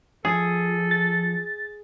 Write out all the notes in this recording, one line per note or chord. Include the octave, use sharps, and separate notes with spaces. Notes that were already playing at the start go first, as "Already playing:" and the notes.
F3 G#4 A4
A6